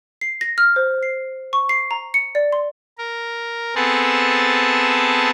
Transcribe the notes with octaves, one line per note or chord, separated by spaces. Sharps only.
C7
A#6
F6
C5
C7
C#6
C7
A#5
C#7
D5
C6
A#4
B3 C4 G#4 A4 A5